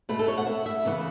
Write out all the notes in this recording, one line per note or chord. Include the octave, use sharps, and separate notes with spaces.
B2 A3 B4
A4
C#5
F#5
E5
E5
C#3 E3 B3